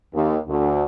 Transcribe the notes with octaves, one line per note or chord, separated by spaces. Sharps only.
D#2
D2